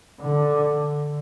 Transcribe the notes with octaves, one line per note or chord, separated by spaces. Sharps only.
D3